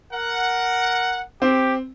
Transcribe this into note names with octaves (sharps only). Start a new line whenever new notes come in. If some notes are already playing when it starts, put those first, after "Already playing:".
A#4 F#5
C4 G4